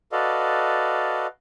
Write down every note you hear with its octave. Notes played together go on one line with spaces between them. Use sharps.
F#4 A4 B4 D5 D#5 F5